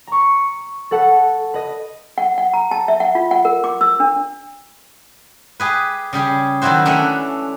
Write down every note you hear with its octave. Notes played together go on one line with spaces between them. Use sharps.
A#5 C#6
A4 B4 F#5 A5
B4 D#5
F#5
F#5
A#5
A5
E5
F#5
F4
F#5
A#4
D6
E6
D4
G4 G#4 B4
C#3 G3 G4 G#4
D#3 F#3 G3 E4 F#4 C5
E3 A3 C#4 D4